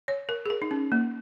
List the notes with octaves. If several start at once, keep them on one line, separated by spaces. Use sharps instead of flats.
C#5
A#4
G#4
A#4
D#4
C#4
A#3